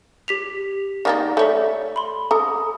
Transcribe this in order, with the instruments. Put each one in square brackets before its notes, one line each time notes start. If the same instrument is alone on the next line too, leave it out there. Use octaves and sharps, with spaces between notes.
[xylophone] G4 B6 F7
[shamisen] D#3 A#3 D#4 [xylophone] D5 A6
[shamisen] A3 C#5 E5 [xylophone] A4
[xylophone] B5 C6
[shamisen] A4 A#5 [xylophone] D#6